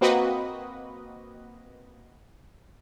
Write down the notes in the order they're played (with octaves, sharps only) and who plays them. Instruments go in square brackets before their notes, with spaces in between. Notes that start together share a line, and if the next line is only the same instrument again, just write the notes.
[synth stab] A#3 C4 F#4 B4 D#5